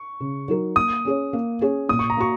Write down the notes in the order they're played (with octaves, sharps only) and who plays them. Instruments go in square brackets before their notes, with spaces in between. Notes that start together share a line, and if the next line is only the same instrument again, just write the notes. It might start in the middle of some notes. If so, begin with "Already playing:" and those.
Already playing: [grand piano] C#6
[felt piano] C#3
F#3 D#4 A#4
[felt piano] A#3 [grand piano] D#6
[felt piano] C#4 G#4 C#5
A#3
C#4 G#4 C#5
[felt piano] A#2 [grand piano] D#6
[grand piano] C#6
A#5
[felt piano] A#3 F#4 [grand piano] C#6